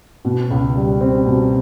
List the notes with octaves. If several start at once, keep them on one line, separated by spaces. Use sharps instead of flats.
B2
C#2
G3
C4
B2